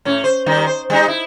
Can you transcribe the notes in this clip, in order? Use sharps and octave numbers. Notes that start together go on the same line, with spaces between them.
A2 C#4
C5
D#3 G3 D#4
C5
G3 D#4
E4